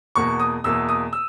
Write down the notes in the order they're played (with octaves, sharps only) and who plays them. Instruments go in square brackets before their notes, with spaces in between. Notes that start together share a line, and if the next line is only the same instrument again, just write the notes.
[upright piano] E2 B2 A#3 C#6
D#6
E2 B2 A#3 E6
D#6
E6